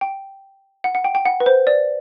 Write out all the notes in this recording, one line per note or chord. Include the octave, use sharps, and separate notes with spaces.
G5
F#5
F#5
G5
G5
F#5
B4
C5
D5